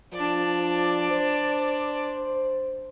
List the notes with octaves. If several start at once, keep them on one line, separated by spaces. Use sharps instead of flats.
F3 D4 D5
C5